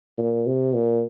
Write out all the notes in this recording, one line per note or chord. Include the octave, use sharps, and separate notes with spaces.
A#2
C3
A#2